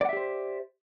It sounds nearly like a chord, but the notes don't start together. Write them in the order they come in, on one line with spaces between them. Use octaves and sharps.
D5 F#5 E5 G4 C5